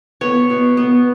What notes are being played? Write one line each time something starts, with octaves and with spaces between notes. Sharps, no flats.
B3 C#5
B2
B3